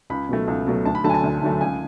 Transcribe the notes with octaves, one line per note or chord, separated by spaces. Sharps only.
C#2 B5
B2 F#3 A3
C#2
B2 F#3 A3
D2 A5
B5
D3 F#3 A3 A5
G#5
A5
D2
D3 F#3 A3
C#2 G#5